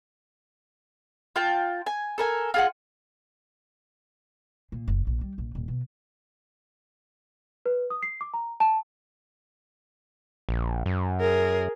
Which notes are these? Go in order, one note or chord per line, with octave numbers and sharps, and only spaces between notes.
F4 G5 A5
G#5
A4 A#4 G#5
F4 G#4 F#5
A#2
F#1
A#1
G3
A#1
D#1
B2
B4
D#6
C7
D6
A#5
A5
A#1
F#2
G#4 A#4